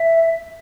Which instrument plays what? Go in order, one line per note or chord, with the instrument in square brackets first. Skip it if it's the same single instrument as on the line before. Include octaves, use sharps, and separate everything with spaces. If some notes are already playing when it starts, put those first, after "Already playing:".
Already playing: [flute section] E5